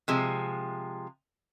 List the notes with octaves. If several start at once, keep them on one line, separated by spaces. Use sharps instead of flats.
C3 F3 G#3